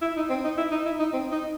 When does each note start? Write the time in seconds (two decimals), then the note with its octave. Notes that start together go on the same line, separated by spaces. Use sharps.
0.02 E4
0.17 D#4
0.30 C4
0.44 D#4
0.57 E4
0.71 D#4
0.85 E4
0.99 D#4
1.13 C4
1.32 D#4